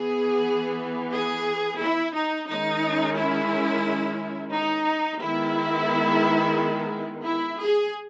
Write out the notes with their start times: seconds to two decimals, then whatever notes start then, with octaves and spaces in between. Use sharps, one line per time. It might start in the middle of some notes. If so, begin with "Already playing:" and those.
Already playing: E3 B3 G#4
1.12 G#4
1.80 E4
2.14 D#4
2.48 D#3 G#3 C#4 D#4
3.17 E4
4.53 D#4
5.21 D#3 G#3 B3 E4
7.25 E4
7.60 G#4